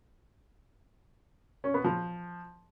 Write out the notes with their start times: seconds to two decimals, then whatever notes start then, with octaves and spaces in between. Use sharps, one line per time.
1.64 C#4
1.74 B3
1.84 F3